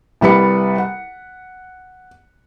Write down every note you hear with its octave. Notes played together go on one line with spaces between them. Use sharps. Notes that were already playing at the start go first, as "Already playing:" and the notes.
C2 G3 B4 B5 C#7
F#5